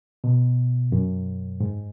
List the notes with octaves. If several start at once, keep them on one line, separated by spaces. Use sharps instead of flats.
B2
F#2
G#2